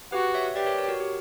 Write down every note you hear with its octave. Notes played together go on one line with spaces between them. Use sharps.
F#4 G4 B4
C#5 E5
G4 B4 D5
A#4 C#5
A#4 C#5
F#4 A#4
G4